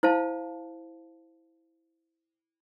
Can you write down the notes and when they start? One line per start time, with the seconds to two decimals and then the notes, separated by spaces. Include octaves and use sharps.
0.03 E4 C5 F5 A5